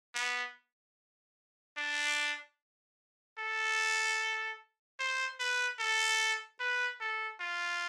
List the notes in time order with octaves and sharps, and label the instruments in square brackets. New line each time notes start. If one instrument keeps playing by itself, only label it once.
[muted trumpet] B3
D4
A4
C5
B4
A4
B4
A4
F4